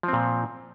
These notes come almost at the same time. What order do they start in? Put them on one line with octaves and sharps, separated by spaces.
F3 C4 A#2